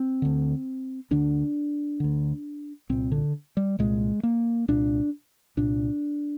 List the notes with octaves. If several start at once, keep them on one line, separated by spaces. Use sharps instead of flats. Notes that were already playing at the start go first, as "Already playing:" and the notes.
Already playing: C4
D2 D3
D2 D3 D4
D2 D3
C2 A#2 C4
D3
G3
C2 A#2 G#3
A#3
C2 A#2 D4
C2 A#2 D4